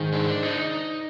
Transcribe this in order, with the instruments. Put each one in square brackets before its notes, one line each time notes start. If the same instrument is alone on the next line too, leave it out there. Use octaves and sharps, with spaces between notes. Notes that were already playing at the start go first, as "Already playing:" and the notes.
Already playing: [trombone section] G#2 [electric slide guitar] D#3
[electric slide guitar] D4
D#4